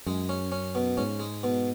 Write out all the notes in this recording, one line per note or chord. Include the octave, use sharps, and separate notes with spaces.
F#2 G#3
C#4
C#4
B2
G#2 C#4
G#3
B2